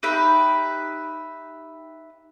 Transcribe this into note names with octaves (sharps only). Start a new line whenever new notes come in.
D#4 G4 B4 E5